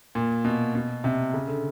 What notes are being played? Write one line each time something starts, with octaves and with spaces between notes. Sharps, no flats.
A#2
B2
B2
C3
C#3
D3